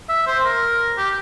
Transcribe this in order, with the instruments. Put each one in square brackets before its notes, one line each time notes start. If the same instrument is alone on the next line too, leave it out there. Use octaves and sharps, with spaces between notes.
[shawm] E5
C5
A#4
G4